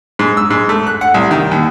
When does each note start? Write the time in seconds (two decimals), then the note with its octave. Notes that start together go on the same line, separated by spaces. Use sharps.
0.19 G#2
0.37 E6
0.50 G#2
0.69 A3
0.87 F#6
1.01 F#5
1.14 C2
1.31 D#3
1.51 D#2